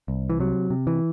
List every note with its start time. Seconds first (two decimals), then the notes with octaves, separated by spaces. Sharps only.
0.08 C2
0.30 E3
0.40 C3 F#3
0.70 C3
0.87 E3